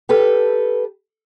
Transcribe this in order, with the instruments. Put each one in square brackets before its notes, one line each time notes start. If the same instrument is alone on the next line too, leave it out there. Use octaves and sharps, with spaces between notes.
[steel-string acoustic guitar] G4 A4 B4